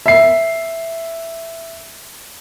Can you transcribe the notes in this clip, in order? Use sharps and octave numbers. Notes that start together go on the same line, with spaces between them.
E5 C7